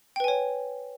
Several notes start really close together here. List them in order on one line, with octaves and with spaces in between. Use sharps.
G5 B4 G#5 C#5